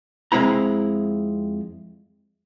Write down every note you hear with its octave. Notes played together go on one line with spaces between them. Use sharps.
F2 G#3 C4 E4 A#5